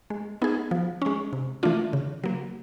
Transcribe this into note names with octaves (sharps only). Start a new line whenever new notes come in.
G#3
B3 D#4 G#4
F3
G#3 C#4
C3
E3 A3 D4 F4
C#3
F#3 A#3